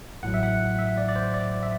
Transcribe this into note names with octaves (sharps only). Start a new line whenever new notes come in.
A1 A2 F#3 F#5
E5
F#5
E5
D5
D5
C5
D5
E5